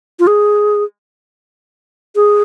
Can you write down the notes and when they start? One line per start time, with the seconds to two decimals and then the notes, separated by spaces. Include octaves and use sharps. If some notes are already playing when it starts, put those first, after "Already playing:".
0.19 F4
0.27 G#4
2.16 G#4